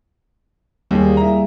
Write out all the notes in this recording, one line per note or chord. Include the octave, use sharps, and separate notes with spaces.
D#2 G3 G#3 A#3 G#4
E4 A#5